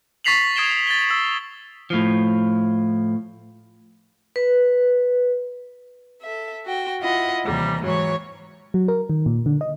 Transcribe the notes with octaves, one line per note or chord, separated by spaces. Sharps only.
C#6 A6 B6 C7 F7 F#7
D#6 G#6 D7 E7 G7
A6 G7
E6
A2 F3
B4
A4 E5
F#4 G5
E4 F4 D#5 F#5
D#2 C3 E3 G3 A#5
G#2 E3 F#3 C#5 C#6
F#3
A#4
D#3
A#2
D3
D#5